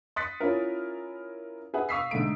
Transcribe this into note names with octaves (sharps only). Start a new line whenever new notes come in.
C6 D#6 F#6 A6 B6 C#7
C#4 E4 F4 A#4
G#4 B4 E5 F#5
F5 C#6 D#6 E6 B6 C7
G#2 D3 A3 D7